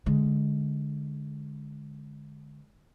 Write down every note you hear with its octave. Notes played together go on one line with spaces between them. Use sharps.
D3 G#3